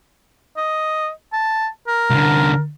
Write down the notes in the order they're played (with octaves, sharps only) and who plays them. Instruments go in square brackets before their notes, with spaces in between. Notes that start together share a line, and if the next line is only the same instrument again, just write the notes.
[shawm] D#5
A5
A#4
[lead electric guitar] C2 D3